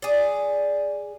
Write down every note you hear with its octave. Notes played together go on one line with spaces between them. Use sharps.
G#4 D5